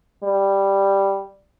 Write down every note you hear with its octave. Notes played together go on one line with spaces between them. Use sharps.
G3